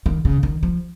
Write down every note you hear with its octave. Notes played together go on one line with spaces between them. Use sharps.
D#3
C#3
D#3
F3